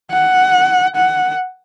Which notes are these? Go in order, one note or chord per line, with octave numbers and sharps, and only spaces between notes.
F#5
F#5